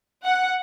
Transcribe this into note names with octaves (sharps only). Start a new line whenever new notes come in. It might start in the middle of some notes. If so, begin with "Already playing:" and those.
F#5